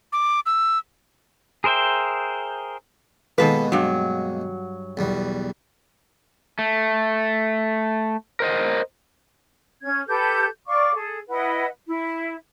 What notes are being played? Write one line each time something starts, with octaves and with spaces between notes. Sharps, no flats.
D6
E6
G#4 A#4 C5 E5 G5
B2 D#3 G#3 A#3 A4 B4
G2 F#3
B1 E2 G3
A3
A#4 C5 D#5
C#4 G#6
G4 A4 B4 G6
D5 F5 C#6 D6
G#4 A4
E4 B4 D#5 F#5
E4